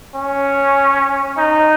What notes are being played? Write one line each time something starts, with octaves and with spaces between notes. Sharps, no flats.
C#4
D#4